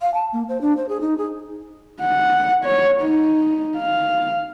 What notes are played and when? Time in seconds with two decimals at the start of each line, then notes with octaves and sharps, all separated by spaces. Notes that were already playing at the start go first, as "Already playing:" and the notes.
0.02 F5
0.14 A5
0.33 A#3
0.49 C5
0.61 D4
0.77 C5
0.89 G#4
1.01 D#4
1.18 G#4
2.01 F#5
2.65 C#5
3.01 D#4
3.77 F5